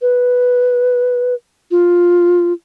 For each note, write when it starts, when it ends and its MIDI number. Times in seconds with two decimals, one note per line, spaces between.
0.02 1.34 71
1.71 2.53 65